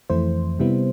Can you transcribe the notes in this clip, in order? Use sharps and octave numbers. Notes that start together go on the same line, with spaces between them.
F2 E3 A3 E4 C5
C3 G3 B3 E4